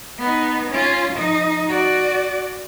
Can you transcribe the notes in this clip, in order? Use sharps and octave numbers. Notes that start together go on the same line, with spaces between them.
B3 D#4
C#4 F4
F3 D#4
F#4 D5